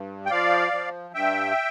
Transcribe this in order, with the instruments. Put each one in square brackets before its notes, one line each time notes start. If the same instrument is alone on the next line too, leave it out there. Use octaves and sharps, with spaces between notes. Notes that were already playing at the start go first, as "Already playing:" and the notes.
Already playing: [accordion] G2
G5
F3 D5 F5
F3
G2 E5 G5